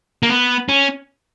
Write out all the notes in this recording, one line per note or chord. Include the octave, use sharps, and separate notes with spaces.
A#3
B3
C#4